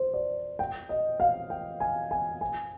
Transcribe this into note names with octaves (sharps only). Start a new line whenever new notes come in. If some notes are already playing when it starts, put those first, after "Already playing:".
Already playing: C5
D5
G5
D#5
F5
G5
G#5
G#5
G#5